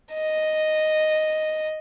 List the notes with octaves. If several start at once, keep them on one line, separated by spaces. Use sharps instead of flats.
D#5